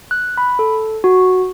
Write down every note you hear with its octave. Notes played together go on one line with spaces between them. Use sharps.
F#6
B5
A4
F#4